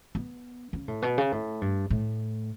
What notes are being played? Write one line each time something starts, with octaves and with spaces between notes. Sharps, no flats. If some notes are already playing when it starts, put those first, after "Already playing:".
B3
C#3
A2
B2
C#3
A2
G2
A2